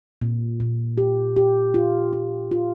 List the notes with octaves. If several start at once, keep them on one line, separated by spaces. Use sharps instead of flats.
A#2
A#2
G4
G4
F4
F4
F4